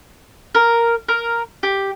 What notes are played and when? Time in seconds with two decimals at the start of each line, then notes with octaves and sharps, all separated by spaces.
0.55 A#4
1.08 A#4
1.63 G4